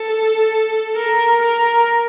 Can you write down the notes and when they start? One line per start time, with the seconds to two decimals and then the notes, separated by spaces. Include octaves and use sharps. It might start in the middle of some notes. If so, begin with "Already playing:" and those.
Already playing: A4
0.96 A#4
1.41 A#4